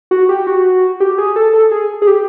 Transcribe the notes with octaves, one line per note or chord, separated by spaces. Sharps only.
F#4
G4
F#4
G4
G#4
A4
A4
G#4
G#4
G4